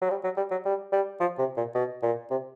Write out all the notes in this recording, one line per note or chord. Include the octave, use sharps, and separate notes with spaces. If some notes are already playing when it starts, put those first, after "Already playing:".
F#3
G3
F#3
G3
F#3
G3
G3
F3
C3
A#2
B2
A#2
C3